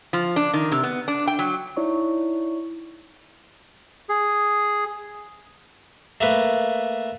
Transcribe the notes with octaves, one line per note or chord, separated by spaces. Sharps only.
F3
D4
D#3
C3
B3
D4
G5
F#3
D#4 E4 C#5 D5 C#6
G#4
A3 A#3 B4